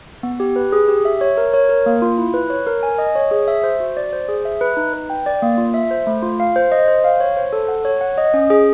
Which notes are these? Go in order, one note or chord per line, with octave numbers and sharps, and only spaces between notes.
B3
G4
B4
G#4
G4
E5
C#5
A#4
C#5
A#4
A#3
F4
E4
B4
C#5
A#4
G#5
D#5
C#5
G#4
E5
C5
F#4
D5
C5
G#4
E5
B4
D#4
B4
G5
D5
A#3
F4
E5
C5
A3
F4
F5
C5
D#5
C5
F5
C#5
C5
A4
F#5
C#5
F#5
D#5
C#4
G#4